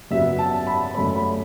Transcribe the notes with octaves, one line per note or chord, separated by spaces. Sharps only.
F#2 C#3 F#3 B3 E5
A5
B5
F#2 C#3 A3 C#4 B5
B5